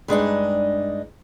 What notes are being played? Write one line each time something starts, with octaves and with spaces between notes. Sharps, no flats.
G2 G#3 D4 D#4